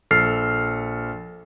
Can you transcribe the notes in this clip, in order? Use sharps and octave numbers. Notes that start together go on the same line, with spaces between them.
A#1 A4 F6 C7